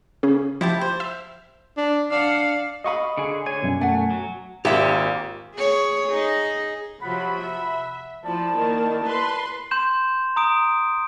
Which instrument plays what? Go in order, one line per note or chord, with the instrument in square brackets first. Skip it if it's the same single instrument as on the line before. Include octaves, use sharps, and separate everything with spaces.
[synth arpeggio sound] C#3 C#4 G#4
[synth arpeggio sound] F3 [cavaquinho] E4 G4 A5
[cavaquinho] C5
[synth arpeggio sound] E5
[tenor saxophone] D4
[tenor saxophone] D4 [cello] F5 F#5
[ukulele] F#4 F5 B5 [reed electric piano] D#5 C#6 D#6
[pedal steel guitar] D3 G#4
[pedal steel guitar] D3 G#5 [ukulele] C#5
[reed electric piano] F#2 B2
[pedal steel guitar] A3 [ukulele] F#5 G#5
[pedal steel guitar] F#3
[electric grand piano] G#1 [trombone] A#2 [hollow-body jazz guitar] G4 E5
[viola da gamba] G#4 C#5
D#4 G#4
[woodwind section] C3 F#5 B5 [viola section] F3 F#3
[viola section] E5
[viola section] F3 [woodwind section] E4 D5 A5
[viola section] D#3 A#3
B4 C6
[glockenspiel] C6 G6 E7
A#5 D#6 D7